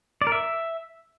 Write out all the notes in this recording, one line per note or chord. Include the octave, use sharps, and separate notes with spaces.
D5
A#4
E5